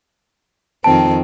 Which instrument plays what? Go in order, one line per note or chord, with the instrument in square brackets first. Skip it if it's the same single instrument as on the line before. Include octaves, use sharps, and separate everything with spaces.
[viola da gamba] F2 D#3 C4 [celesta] A5